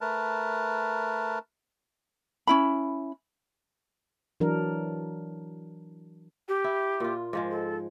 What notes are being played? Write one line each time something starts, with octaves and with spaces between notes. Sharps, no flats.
A3 A#4 B4 A5
C#4 E4 B5
E3 F#3 D4 A#4
G4
E4
A#2 F4
G#2 F3 G#3
A4